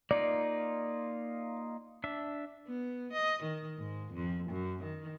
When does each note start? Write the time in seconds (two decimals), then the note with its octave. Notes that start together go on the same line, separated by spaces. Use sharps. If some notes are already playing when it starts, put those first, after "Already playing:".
0.11 A#3 D#4 F4 D5
2.04 D4 E5
2.67 B3
3.13 D#5
3.43 D#3
3.78 G#2
4.13 F2
4.49 F#2
4.84 D#3